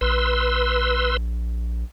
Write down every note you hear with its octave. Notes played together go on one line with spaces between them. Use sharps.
A#1 B4 C6 E6